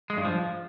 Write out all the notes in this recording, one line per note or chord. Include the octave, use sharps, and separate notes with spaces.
G#3
G2
F3